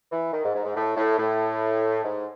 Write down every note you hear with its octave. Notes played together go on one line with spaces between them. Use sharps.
E3
D#3
G#2
G#2
G#2
A2
A2
A2
G#2